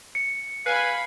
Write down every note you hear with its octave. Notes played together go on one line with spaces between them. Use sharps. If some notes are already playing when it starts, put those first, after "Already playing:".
C#7
B4 F5 G#5 B5 C7